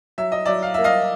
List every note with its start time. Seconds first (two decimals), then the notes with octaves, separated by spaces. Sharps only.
0.18 F#3 E5
0.32 D#5
0.45 F#3 D5 E5
0.63 F5
0.74 A#3 E5
0.84 D#5 F5